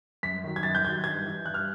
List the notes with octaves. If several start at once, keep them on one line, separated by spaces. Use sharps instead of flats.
F#2 B6
D#3 F#3
G#6
F#2 A6
G6
D#3 F#3 G#6
G2 G#6
E3
G2 F#6
F6